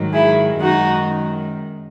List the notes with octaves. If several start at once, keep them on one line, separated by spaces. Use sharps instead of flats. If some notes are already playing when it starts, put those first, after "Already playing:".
Already playing: G#2 D#3 F#3
E4 G#4
F#2 D#3 G#3 D#4 F#4